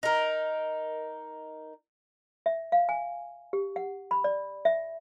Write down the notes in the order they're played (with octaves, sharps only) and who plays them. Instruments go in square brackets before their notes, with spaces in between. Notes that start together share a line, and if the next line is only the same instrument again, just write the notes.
[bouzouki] D#4 A#4
[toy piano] E5
F5
G#5
G4
F#5
B5
D5
E5